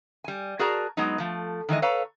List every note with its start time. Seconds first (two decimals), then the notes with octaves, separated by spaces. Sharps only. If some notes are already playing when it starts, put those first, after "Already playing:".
0.24 G3 G#5
0.59 F#4 G#4 A#4 D5 A5 A#5
0.97 F#3 G#3 B3 D#4
1.18 F3 A3
1.69 D#3 E3 G#3 D#5
1.82 A4 B4 C#5 F5 A#5